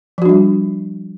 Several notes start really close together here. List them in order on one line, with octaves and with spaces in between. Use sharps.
F3 F#4 D4 G3